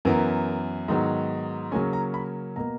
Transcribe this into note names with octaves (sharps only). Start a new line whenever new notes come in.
F#2 E3 B3 A#4
G#2 D#3 F#3 B3
C#3 F#3 A#3 C#4 G#5
A#5
B5
B2 A#3 A#5